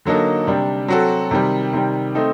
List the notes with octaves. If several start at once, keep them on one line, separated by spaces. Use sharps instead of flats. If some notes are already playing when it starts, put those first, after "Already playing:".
D3 F#3 A#3 D#4 A4
C3 G3 D4
F#3 C4 F#4 A4
C3 D#3 G3
C3 D#3 G3
A3 C4 D#4 A4